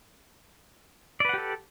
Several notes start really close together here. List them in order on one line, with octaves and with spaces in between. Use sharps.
D5 B4 F#5 G4 A4